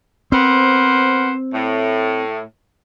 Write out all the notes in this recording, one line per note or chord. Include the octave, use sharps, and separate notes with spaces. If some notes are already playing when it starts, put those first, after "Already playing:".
B3 C4 A#4 C5
A2